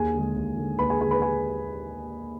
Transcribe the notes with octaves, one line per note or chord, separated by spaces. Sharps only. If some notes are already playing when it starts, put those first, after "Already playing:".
Already playing: D#2 G#4 G#5
D3 G#3
D#2
D3 G#3
D#2 B4 B5
G#4 G#5
D3 G#3 G#4 G#5
B4 B5
G#4 G#5